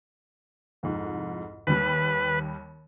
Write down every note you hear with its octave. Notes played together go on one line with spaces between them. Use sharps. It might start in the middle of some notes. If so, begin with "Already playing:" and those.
C2 F2 G#2
D#2 G3 B4